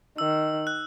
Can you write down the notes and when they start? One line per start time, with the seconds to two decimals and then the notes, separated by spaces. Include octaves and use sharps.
0.18 D#3 E6
0.67 F#6